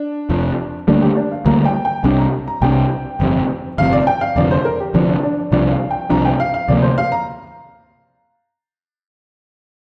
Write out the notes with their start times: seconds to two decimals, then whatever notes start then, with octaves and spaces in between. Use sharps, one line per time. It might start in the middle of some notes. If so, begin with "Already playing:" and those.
Already playing: D4
0.30 F1 F2 F3
0.88 D2 D3 G3 A#3 D4
1.02 G4
1.17 D4
1.32 F5
1.46 D2 D3 G3 A#3 A#5
1.65 G5
1.85 G5
2.03 C2 C3 G3 D4 G5
2.18 A#5
2.48 A#5
2.62 C2 C3 G3 D4 G5
3.20 G1 F2 C3
3.78 G1 F2 C3 F5
3.93 D5
4.07 G5
4.21 F5
4.36 F1 F2 D3 F3 D5
4.51 C5
4.65 A#4
4.80 G4
4.94 F1 F2 D3 F3 D4
5.09 D4
5.23 D4
5.38 D5
5.52 C2 C3 F3 D4 D5
5.72 F5
5.91 G5
6.10 C2 C3 F3 D4 A#5
6.25 G5
6.40 F5
6.54 F5
6.68 D2 C3 F3 A#3 D5
6.82 C5
6.98 F5
7.12 A#5